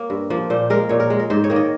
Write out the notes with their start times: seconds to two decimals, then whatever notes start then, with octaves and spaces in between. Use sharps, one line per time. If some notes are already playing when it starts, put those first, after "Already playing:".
Already playing: A#3 C#5
0.10 G2
0.30 F3 A#3
0.50 A#2 C5
0.70 G#3 A#4
0.89 A#2 C#5
1.00 A#4
1.10 G#3
1.19 A#4
1.30 G#2 C5
1.44 C#5
1.50 D#3 A#3
1.56 D#5